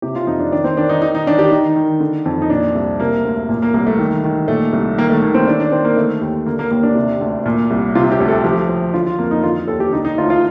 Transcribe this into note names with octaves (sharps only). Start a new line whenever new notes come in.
C3 G4
F4
F2 D#4
D4
D#3 D4
C4
D#3 D4
D#4
D#3 D#4
D#4
D#3 D4
G4
D#3 D#4
D#3
D3
F2
D#4
A#2 D4
C2
C3 A#3
D2
A#2 A#3
A#3
C2 A#3
A3
D#3
D#3
A#2 A3
C2
D#3 A#3
A3
D#3 A#3
C4
D#3 D4
D4
D#3 C4
A#3
D3 A3
D#2
D3 A#3
A#3
D#2 A#3
D4
C3
D2
A#2
C2
C3 F4
G4
D2
A4
F3 G4
F3
D3 F4
F4
F2 A#3
D#4
D3 F4
D#2 A4
G4
D3 D#4
D#4
D2 F4
F4